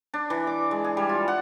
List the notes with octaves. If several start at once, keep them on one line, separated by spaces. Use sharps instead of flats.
D4
E3
D6
G#3
G#4
G3
F4
F#5